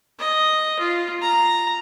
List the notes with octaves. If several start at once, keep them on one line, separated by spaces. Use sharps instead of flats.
D#5
F4
A#5